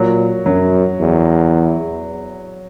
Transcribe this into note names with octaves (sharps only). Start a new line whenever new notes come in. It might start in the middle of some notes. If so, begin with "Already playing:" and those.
Already playing: A#2 F#3
F#2 F#3
E2